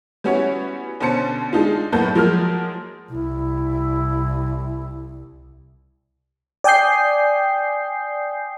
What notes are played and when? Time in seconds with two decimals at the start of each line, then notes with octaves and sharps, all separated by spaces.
0.24 G3 B3 C#4 E4 F#4 C#5
1.00 B2 D3 C#4 C5 A5 C#7
1.53 G#3 D4 D#4 F4
1.92 F#2 A2 A#3 B3 A5 G6
2.15 F3 F#3 G#3 A#3 A#4 F6
3.10 C2 E4
6.64 D5 G5 G#5 D#6 G6 C7